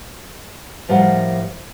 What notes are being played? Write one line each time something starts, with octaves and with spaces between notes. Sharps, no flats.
A2 F3 G3 A#4 F#5